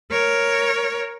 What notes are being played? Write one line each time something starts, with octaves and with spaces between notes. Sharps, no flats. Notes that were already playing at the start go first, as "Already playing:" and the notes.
A#4 C#5